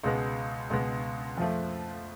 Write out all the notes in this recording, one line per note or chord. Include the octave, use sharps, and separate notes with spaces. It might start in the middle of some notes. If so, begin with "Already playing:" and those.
C#2 B2 G#3 B3
C#2 B2 G#3 B3
F2 F3 A3